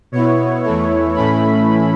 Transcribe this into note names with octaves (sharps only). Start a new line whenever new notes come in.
B2 B3 E4 C#5
E2 E3 A3 E4
A2 E3 A3 C#4 E4 B5